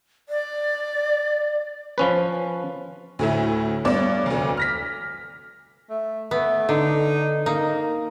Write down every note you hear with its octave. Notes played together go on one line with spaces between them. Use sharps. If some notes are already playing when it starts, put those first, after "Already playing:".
D5
F3 C#4 B4
D2 A2 E4
G2 B3 C#5 D5 D6 E7
F1 D2
F6 A#6 B6
A3
A3 B3
D3 D#4
A#3 D#4